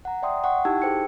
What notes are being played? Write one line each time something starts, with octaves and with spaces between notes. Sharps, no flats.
F#5 A#5
D5 E5 G5 C6 D#6
F#5 G5 C#6
D#4 E4 G4 A5 E6 G#6
G#4 A4 C5 G5 E6 C#7